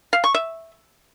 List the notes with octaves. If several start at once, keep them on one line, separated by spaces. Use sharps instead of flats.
F5
C#6
E5